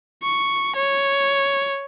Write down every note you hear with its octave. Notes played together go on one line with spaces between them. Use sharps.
C#6
C#5